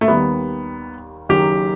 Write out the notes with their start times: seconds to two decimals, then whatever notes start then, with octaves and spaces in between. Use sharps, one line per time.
0.01 A3
0.08 D#2 D#3 G3 B3
1.29 F#1 F#2 D#3 G4